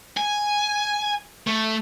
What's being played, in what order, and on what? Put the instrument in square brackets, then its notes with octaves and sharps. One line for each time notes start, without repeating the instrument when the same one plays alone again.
[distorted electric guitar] G#5
A3